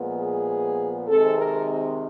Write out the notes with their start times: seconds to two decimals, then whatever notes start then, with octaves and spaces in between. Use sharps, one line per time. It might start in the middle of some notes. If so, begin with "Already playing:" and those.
Already playing: A#2 F3 G#3 B3
0.17 G#4
1.07 C3 D#3 G#3 C4 A4
1.37 A#4